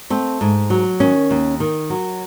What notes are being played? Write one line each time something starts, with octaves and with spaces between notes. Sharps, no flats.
A3 C4
G#2
F#3
D#3 C#4
D#2
D#3
F#3